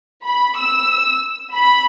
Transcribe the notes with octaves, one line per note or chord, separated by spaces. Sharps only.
B5
E6
B5